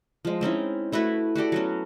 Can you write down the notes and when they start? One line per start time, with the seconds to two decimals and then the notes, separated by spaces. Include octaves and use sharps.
0.25 F3 G#3
0.41 C4 C#4 D#4 E4
0.92 A3 E4 F#4 B4
1.36 F#4 G4 A4 D5
1.52 F#3 B3 C#4